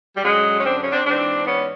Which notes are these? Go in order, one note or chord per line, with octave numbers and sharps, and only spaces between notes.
G3
F#2 D3 F#3 G#3
C#4
C4 D4
C#4
C4 D4
G#2 E3 C4 D4
B3 C#4